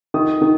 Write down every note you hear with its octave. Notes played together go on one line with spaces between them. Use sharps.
D#3 D#6
D#3